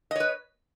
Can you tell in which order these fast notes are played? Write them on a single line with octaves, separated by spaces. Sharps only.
D#5 C#5 B4